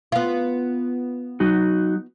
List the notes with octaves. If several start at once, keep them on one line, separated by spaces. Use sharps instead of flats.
B3 F4
F#3 D#4 F#4